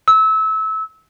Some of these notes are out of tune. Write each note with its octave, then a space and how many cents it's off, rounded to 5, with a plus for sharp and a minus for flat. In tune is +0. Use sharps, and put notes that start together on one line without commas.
E6 -25